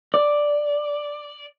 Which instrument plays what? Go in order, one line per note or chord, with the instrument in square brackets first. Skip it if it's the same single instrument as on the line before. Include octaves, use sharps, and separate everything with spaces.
[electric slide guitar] D5